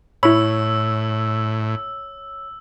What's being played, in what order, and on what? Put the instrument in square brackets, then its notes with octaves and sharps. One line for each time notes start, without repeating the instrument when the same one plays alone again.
[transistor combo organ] A2 [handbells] E4 B5 [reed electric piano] C#5 [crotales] E6